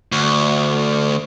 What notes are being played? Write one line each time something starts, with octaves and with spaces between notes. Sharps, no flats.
D2